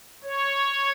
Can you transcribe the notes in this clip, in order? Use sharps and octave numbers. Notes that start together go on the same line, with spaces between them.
C#5